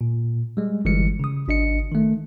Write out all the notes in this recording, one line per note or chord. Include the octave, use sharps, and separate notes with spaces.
A#2
G3 G#3
G1 E3 G3 G#3 C#7
C#3 D#6
G#1 D4 D#5 C#7
D#3 A3